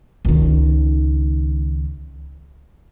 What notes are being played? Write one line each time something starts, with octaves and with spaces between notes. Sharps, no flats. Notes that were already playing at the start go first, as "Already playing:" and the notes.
C#2 D#3